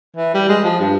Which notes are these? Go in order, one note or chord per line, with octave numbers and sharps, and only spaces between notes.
E3
G3
G#3
F3
G2